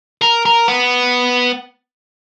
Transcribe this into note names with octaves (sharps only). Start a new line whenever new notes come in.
A#4
A#4
B3